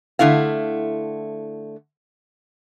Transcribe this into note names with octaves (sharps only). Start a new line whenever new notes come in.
D3 A3 E4 F5